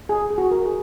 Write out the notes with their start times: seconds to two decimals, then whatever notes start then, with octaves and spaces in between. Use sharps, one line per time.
0.09 G#4
0.31 G#4
0.38 F#4
0.51 A#4
0.66 G#4